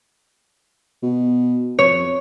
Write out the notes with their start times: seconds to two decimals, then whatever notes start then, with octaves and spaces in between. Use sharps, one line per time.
1.03 B2
1.79 F2 C#5